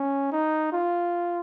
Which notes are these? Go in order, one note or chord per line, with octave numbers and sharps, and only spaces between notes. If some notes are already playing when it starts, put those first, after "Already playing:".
Already playing: C#4
D#4
F4